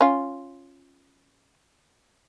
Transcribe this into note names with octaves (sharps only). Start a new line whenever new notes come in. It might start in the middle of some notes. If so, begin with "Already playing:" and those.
C#4 F4